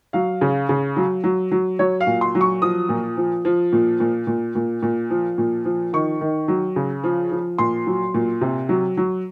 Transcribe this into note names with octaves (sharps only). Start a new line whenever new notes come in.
F#3 F5
C#3
C#3
F#3
F#3
F#3
F#3 C#5
F5
A#2
C6
F#3
C#6
F3 D#6
A#2
F3
F3
A#2
A#2
A#2
A#2
A#2
F3
A#2
F3
D#3 C#6
D#3
F#3
C#3
F3
F3
A#2 C6
F#3
A#2
C3
F#3
F#3